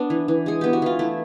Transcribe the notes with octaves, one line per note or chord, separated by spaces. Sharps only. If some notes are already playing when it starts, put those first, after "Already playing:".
Already playing: B3 D4
E3
E3
G#3 G#4
B3 G4
F#4
E3 F4
A3 E4